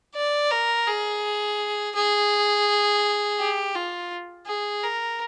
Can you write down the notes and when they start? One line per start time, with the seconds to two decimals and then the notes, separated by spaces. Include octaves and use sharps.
0.15 D5
0.51 A#4
0.87 G#4
1.95 G#4
3.40 G4
3.75 F4
4.47 G#4
4.83 A#4